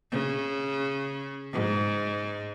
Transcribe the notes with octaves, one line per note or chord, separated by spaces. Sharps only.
C#3
G#2